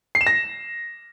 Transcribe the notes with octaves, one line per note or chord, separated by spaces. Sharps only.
C7
E7
A#6